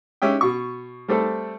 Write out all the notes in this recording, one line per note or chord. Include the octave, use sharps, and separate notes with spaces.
G#3 C#4 G4 E5 G5
B2 C#6
G3 A3 C4 A4